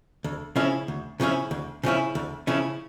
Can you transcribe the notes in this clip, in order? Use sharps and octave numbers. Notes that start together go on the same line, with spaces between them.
D2
C#3 F3 C#4 E4
D2
C#3 F3 C#4 E4
D2
C#3 F3 C#4 E4
D2
C#3 F3 C#4 E4